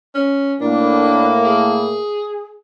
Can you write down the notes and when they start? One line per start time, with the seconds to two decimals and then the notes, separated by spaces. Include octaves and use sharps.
0.15 C#4
0.60 A2 A#3 D4 E4
1.45 G#4